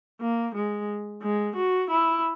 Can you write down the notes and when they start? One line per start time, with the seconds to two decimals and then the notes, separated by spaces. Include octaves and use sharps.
0.21 A#3
0.55 G#3
1.22 G#3
1.56 F#4
1.90 E4